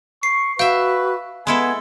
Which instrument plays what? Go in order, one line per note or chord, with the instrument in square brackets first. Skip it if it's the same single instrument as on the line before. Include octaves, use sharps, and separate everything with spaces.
[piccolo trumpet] C#6 [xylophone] C7
[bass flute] F#4 [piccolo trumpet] B4 [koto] E5 G5 [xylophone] F5
[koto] G#3 E4 A4 [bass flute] B3 [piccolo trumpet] G#5